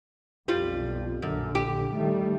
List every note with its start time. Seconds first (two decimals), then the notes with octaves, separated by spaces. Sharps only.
0.48 B1 F2 G3 F4
1.22 A#1 F#2 D3
1.55 G4
1.93 D#3 G3 A3